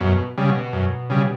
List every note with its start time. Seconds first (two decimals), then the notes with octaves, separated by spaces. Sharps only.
0.01 F#2 B2 B3
0.38 C#3 G3
0.49 B2 B3
0.73 F#2
1.10 C#3 G3